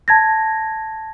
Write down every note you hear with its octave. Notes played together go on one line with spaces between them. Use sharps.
A5 G#6 A#6